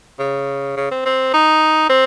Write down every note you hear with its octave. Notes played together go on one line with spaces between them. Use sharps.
C#3
C#3
C4
C4
D#4
C4